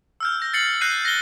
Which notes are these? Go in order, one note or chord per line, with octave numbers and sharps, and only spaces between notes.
E6 F6 G6
G6 A#6
A6 C7 C#7 F#7
F#6 G6 A#6 C7 D#7
A#6 G7